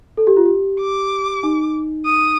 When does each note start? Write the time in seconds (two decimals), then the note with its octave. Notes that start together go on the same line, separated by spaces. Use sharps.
0.17 A4
0.27 G4
0.37 F4
0.46 G4
0.80 D6
1.43 D#4
2.06 D#6